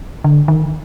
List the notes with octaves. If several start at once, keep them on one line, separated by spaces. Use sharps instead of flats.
D3
D#3